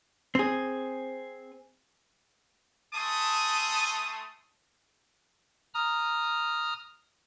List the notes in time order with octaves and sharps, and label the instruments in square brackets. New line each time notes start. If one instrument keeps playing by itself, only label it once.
[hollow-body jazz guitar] C4 G#4
[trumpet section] A3 G#5 A5 C6 D#6
[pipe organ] A#5 D#6 F6